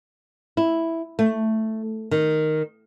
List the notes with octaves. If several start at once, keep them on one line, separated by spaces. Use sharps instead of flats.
E4
A3
D#3